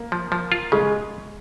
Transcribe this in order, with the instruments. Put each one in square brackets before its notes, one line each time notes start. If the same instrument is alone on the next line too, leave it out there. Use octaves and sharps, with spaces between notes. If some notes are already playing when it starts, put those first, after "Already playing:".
Already playing: [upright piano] A#3
[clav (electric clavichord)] F3
F3
F4
[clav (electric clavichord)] C#3 [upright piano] G#3